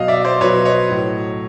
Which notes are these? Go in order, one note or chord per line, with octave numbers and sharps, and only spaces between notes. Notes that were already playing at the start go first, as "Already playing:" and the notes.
Already playing: B2 F#3 D#5 F5
D5 E5
C5 D5
B2 F#3 B4 C#5
C#5 D#5
A2 F#3